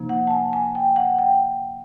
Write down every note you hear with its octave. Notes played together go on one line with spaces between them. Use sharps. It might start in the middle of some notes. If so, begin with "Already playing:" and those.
Already playing: C3 F3 A#3 D#4
F#5
A5
G#5
G#5
G5
F#5
G5